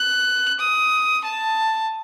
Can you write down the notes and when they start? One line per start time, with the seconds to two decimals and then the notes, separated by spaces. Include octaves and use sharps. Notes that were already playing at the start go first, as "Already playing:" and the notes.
Already playing: F#6
0.59 D#6
1.24 A5